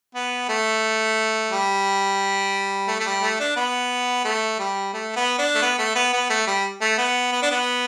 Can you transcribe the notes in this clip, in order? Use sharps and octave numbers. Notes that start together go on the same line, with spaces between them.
B3
A3
G3
A3
A3
G3
A3
D4
B3
A3
G3
A3
B3
D4
A3
B3
A3
B3
B3
A3
G3
A3
B3
B3
D4
B3